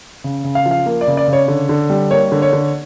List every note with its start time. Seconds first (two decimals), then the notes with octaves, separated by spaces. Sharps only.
0.24 C#3
0.44 C#3
0.55 F5
0.66 F3
0.71 F5
0.86 A#3
1.01 D5
1.08 C#3
1.17 D5
1.28 C#3
1.33 C#5
1.48 D3
1.69 D3
1.90 G3
2.11 A#3 C#5
2.32 D3
2.42 C#5
2.53 D3